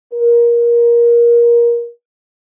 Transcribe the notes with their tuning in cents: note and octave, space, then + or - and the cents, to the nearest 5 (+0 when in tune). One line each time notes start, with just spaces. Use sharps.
A#4 +20